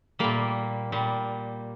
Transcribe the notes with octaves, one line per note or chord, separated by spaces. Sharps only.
A#2 G3 A#3
A#2 G3